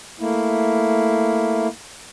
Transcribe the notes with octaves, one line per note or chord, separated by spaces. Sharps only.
A3 A#3 E4